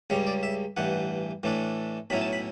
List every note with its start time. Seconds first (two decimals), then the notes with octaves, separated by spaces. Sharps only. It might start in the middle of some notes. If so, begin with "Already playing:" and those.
0.10 C#2 C#3 G3 C#5
0.27 D5
0.43 E5
0.77 A1 G2 E3 F#5
1.43 A2 E3 A3 D4
2.10 B1 A2 F#3 C#4 E4 B5
2.21 A5
2.33 B5